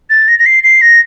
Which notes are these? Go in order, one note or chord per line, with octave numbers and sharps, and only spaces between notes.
A6
A#6
A#6
C7
C7
A#6